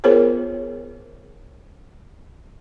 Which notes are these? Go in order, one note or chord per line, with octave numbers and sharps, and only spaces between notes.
B3 F4 G#4 A#4 C5 C#5